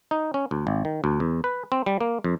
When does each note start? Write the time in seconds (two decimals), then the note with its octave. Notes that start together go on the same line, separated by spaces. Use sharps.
0.11 D#4
0.34 C#4
0.51 D2
0.67 G#1
0.85 D#3
1.04 D2
1.20 E2
1.44 B4
1.72 C4
1.86 G3
2.01 A#3
2.24 F2